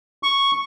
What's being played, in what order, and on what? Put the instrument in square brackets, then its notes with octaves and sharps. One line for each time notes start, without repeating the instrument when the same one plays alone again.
[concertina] C#6